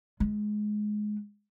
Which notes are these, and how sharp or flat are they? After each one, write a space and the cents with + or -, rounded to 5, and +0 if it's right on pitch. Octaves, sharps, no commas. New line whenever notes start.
G#3 +15